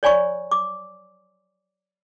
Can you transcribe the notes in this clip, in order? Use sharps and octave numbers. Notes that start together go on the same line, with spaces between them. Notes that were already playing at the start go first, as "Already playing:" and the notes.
C#5 D5 G#5 B5 C#6
D6